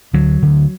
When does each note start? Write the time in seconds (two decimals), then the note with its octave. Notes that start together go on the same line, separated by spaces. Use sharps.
0.13 D2 D3 F#3
0.42 D2 D3